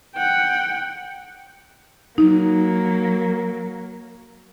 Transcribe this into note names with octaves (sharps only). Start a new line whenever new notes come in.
F#5 G5
F#3 A#3 D#4